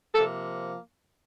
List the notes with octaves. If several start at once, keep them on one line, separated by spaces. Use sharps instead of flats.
C3 F3 A#3 A4